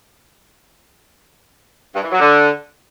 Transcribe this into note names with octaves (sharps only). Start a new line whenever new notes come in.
G2
E3
F#3
D3